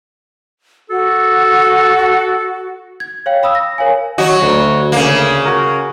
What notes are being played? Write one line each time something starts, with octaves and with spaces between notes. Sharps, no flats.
F#4 A4
G#6
C#5 F5 G5
F5 B5 D#6 E6
A#6
A#4 C#5 F5 G#5
F#3 F#4 D#5
D2
C#3 A#3
F#4 A#4